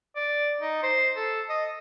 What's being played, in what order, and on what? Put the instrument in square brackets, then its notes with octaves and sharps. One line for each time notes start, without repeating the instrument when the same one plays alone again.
[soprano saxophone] D5
D#4
C5
A4
D#5